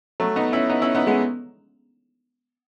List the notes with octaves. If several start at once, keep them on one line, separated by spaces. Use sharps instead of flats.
F#3 A3
B3 D#4
C#4 E4
B3 D#4
C#4 E4
B3 D#4
G#3 B3